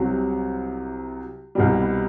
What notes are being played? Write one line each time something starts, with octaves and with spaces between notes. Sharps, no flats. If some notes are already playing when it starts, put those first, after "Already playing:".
Already playing: C2 C3 F#3
C2 B2 G3